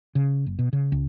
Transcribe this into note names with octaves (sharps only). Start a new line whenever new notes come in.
C#3
F#1
B2
C#3
C#2